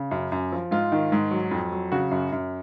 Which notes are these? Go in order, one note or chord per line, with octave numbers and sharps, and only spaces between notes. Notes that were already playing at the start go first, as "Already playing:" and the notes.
Already playing: C#3
F#2
F#2
F3
G#2 F4
D#3
G#2
F#3
F2
F#3
C#3 F#4
F#2
F#2